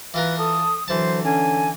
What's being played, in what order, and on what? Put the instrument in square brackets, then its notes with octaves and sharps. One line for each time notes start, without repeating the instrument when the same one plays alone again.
[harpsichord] E3 F4 A#4 [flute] B4
[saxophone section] A4 [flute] D#6
[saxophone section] D3 F#3 [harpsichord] E3 A5 [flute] C5
[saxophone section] D3 C#4 [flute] G#5